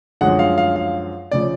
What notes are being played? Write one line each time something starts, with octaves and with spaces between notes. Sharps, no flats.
F#2 D3 F3 G#3 F#5
F5
F5
F5
C#3 F3 D5